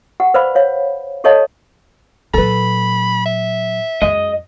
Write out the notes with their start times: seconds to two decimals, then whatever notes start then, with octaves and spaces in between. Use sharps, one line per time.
0.20 G4 F#5
0.34 B4 C5 D5 F5 B5
0.55 C#5 F5
1.24 G4 A4 C#5 D#5 F5 A5
2.34 A#2 F#3 A4 B4 B5
3.26 E5
4.02 F#2 G#3 D#5